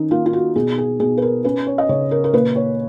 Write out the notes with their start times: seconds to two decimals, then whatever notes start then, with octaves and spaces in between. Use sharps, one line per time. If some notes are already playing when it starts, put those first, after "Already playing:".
Already playing: D#3 C#4 D#4
0.11 A#3 F4
0.26 F4
0.33 F#4
0.56 B2 G#4
0.78 G#4
1.00 B2 G#4
1.18 B4
1.22 A#4
1.44 C#4 B4
1.67 C#5
1.78 D#5
1.89 C#3 C#5
2.11 A#4
2.24 A#4
2.33 A#2 B4
2.56 C#5